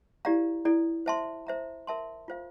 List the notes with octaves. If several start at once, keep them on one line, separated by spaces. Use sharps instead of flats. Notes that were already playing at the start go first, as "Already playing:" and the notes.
E4 G4 D5 F5 A#5
E4 A4 D5
C5 E5 A5 C6
C5 E5 A#5
A#4 E5 A5 C6
F4 C5 F5